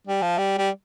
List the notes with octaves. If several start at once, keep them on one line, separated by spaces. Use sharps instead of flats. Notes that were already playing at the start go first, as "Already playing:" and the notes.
G3
F3
G3
G3